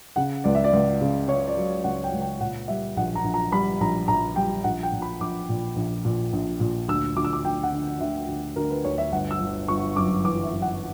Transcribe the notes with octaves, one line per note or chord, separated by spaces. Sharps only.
C#3 F#5
C#2 D5
E5
D5
C#2
C#3
C#3 C#5
D5
F#3
C#2 F#5
G5
C#2
G5
A#2 F#5
G3 E5
A#1 F#5
A#5
A#1
A#5
G3 B5
A#1 A#5
A#1 A#5
G3 G5
A#1 F#5
G5
A#2
B5
A#1 D6
A#2
A#1
A#2
A#1
A#2
D2 E6
D2 D6
E6
D6
D2 G5
F#5
D3
D2 E5
D2
D2 A#4
B4
D2 C#5
E5
G1 F#5
E6
G1
G1 C#6
F#2 D6
E3 D6
E5
F#2
F#5